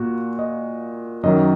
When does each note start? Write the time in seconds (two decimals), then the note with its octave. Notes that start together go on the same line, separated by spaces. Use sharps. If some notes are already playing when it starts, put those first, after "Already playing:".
Already playing: A#2 A#3 F#4
0.39 D#5
1.23 F#2 D#3 F#3 D#5